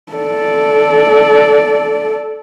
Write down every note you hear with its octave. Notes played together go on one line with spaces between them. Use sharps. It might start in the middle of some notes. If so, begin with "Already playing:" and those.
A4 D5